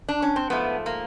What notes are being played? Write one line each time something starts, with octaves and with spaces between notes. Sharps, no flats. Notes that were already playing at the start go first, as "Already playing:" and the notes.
D4
C#4
C4
G#2 F3 A3 B3
A#3